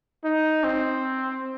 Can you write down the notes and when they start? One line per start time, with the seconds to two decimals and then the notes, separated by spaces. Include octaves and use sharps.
0.24 D#4
0.64 C4